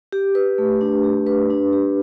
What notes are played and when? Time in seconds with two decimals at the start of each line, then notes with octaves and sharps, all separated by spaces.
0.12 G4
0.35 B4
0.58 A3
0.81 D4
1.04 G4
1.26 B4
1.50 D4
1.73 G4